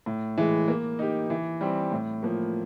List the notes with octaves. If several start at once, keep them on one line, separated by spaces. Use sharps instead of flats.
A2
E3 G#3
A#3
D#4 G4
E3
G3 C4
A2
F3 A#3